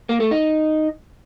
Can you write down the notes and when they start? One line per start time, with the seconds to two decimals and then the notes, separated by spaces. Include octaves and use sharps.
0.09 A#3
0.20 A3
0.31 D#4